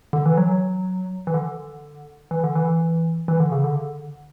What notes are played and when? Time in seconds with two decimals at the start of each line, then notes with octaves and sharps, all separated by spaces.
0.13 D3
0.26 E3
0.37 F#3
1.27 E3
1.34 D3
2.31 E3
2.44 D3
2.55 E3
3.28 E3
3.40 D3
3.52 C#3
3.64 D3